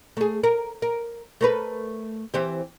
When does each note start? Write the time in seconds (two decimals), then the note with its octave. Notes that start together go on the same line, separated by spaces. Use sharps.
0.17 A3 G#4
0.44 A#4
0.82 A#4
1.41 A3 A#4 B4
2.34 E3 C4 G4